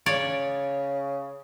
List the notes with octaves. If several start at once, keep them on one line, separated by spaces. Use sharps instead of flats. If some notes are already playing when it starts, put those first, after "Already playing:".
C#3 C#5 D5